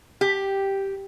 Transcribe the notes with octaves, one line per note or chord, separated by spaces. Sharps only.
G4